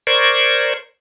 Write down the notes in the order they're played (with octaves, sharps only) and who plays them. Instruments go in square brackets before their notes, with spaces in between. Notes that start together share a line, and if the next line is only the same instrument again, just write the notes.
[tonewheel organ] A#4 C5 D5 C#6 G#6